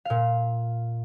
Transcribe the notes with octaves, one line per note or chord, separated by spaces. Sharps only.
A#2 F5